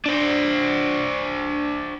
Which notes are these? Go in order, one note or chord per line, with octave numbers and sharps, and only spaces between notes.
D4 C5